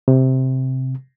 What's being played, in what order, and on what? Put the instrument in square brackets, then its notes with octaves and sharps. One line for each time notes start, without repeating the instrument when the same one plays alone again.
[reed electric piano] C3